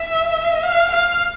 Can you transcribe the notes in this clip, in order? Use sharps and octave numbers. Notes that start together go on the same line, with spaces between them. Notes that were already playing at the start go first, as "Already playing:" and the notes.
Already playing: E5
F5
F5